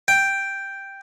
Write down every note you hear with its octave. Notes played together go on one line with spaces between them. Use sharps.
G5